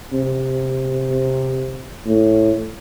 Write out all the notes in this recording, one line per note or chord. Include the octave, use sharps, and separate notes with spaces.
C3
A2